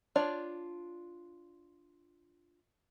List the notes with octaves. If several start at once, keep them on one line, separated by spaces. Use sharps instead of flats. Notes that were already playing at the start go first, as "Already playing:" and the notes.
D4 F4 C#5 D5